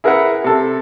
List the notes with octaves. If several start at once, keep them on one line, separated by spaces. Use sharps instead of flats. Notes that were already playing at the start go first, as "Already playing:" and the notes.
E4 G#4 A#4 B4 E5 F#5
C3 A4